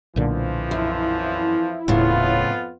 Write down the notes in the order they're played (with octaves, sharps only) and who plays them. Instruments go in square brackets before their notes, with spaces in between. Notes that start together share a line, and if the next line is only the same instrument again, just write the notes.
[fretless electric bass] B1 A#2 D3 [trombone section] F2 E3 F3
[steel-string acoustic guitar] F#2 [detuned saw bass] E4
[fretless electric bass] D#1 [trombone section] F2 B3 F4 [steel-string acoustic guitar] A2 C#3